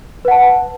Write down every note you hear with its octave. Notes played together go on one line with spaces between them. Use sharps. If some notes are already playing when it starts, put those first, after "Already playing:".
B4 F#5 A5